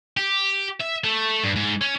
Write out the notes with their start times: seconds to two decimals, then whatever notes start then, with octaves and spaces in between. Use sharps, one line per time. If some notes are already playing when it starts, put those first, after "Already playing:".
0.17 G4
0.80 E5
1.04 A3
1.44 G2
1.56 G#2
1.81 C#4